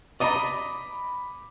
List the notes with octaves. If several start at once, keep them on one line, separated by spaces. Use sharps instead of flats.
D5 D#5 A#5 B5 D6